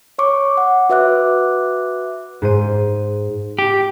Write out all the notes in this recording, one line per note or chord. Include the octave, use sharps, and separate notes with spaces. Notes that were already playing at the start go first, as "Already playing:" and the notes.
C#5 C#6 D6
F#5
F#4 B4 E5 D6 F#6
G#2 C5 D#7
G4